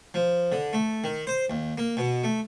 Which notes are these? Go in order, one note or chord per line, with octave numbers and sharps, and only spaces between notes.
F3
D3
A3
D#3
C5
D#2
A#3
B2
A3